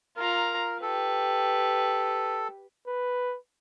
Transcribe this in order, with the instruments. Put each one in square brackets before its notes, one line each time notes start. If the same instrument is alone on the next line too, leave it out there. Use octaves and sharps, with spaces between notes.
[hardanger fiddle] F4 A#5 [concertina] A#4
[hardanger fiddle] G4 B4 [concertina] A4
[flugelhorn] B4